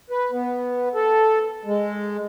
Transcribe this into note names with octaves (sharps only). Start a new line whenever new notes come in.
B4
B3
A4
G#3